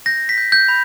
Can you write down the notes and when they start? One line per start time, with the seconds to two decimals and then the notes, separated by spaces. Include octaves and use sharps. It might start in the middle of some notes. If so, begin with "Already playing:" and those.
0.06 G6 A#6
0.29 B6
0.38 G6
0.52 G6
0.68 B5